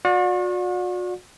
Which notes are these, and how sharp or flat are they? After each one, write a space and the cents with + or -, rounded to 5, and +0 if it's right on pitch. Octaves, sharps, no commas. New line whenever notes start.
F#4 -40 D5 +0 F#5 -45